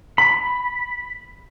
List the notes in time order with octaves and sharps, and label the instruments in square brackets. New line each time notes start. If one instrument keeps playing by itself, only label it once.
[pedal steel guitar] B5